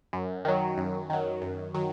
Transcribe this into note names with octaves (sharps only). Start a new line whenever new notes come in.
F#2
D#3 F#3
F#2
D#3 F#3
F#2
D#3 F#3